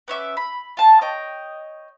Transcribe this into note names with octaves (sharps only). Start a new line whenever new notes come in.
B3 C#4 E5 D6
B5
F4 A5
C#5 D#5 G5